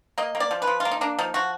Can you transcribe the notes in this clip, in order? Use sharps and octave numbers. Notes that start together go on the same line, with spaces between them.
A#3 D#5
A#3
D5
F3
B4
F3
F4
A#3
D#4
A#3 D4
F3 D#4
F3 F#4